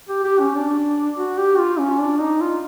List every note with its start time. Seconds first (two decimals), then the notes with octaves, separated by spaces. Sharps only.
0.09 G4
0.24 G4
0.40 C#4
0.55 D4
1.18 F#4
1.38 G4
1.59 F4
1.79 C#4
2.00 D4
2.20 D#4
2.41 F4